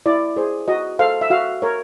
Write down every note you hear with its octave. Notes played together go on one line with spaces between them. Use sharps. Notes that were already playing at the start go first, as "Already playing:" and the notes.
E4 D5
G#4 C5
F#4 D#5
A4 C5 F5
E5
F#4 F5
A#4 C#5